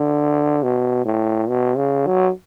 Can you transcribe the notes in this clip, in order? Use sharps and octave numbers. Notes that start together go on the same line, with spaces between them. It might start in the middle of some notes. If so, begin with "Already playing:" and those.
Already playing: D3
B2
A2
B2
C#3
F#3